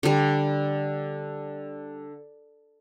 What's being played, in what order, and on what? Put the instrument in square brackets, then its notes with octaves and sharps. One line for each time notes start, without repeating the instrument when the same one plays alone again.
[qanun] D3 G3